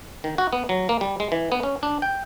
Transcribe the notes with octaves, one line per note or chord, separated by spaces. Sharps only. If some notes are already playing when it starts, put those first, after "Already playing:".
D#3
F#4
B3
F#3
A#3
G3
G#3
E3
B3
C#4
D4
G5